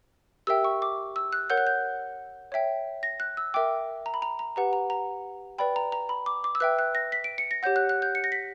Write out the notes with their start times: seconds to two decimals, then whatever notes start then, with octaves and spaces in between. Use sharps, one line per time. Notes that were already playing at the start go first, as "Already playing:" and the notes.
0.47 G4 A#4 E5 G5 E6
0.64 C#6
0.82 D6
1.16 E6
1.33 F#6
1.50 A#4 C#5 F#5 G6
1.57 F#6
1.67 G6
2.52 C#5 E5 G5
3.03 A#6
3.20 F#6
3.37 E6
3.54 A#4 E5 G5 D6
4.06 A#5
4.14 B5
4.22 A#5
4.39 A#5
4.56 G4 B4 F#5 A#5
4.73 A#5
4.90 A#5
5.58 B4 D5 G5 B5
5.76 A#5
5.92 A#5
6.09 B5
6.26 D6
6.44 D6
6.55 E6
6.60 B4 E5 G5 F#6
6.79 F#6
6.95 A#6
7.12 B6
7.24 D7
7.38 C#7
7.51 A#6
7.63 G4 C#5 F#5 G6
7.76 F#6
7.89 F#6
8.02 G6
8.15 C#7
8.24 A#6
8.32 B6